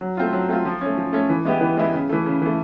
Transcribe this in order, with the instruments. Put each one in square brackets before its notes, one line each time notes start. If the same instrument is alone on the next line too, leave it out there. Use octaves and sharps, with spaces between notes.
[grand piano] F#3
A3 C4 F4
F#3
A3 C4 F4
F3
A3 C#4
F3
A3 C#4
E3
G#3 B3 E4 G4
E3
G#3 B3 E4 G4
C#3
E3 A3
C#3
E3 A3